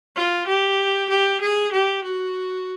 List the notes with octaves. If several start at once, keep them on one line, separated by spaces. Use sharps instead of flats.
F4
G4
G4
G#4
G4
F#4